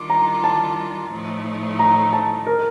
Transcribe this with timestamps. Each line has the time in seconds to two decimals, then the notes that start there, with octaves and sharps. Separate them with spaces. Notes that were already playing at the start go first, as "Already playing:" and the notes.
Already playing: D#3 G3 D4 F4 D6
0.10 A#5
0.44 A5
1.11 A2 F3 A3 D#4
1.79 A#5
2.13 A5
2.47 A#4